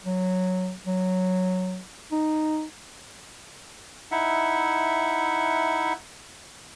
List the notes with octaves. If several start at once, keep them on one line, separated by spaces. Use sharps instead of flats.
F#3
F#3
D#4
D#4 E4 E5 F#5